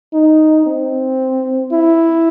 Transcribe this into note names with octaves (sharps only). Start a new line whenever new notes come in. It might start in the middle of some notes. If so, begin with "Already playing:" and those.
D#4
C4
E4